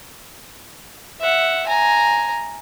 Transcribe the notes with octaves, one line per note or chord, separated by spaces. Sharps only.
E5 F#5
G#5 A#5